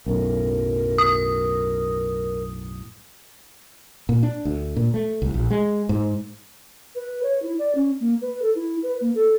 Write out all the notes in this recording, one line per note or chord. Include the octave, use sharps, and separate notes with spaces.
B1 F#2 A2 A#4
D#6
A#2
D4
D2
A#2
A3
C2
A#1
G#3
G#2
B4
C#5
E4
D5
C#4
A#3
B4
A4
E4
B4
A#3
A4